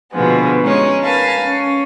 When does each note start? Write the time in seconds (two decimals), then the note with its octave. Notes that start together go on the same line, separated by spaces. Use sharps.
0.12 B2 D3 F3 G#3 B3
0.63 G#3 C#4 D#4 C#5
1.02 A#4 B4 F5 G#5 A5 A#6
1.42 C#4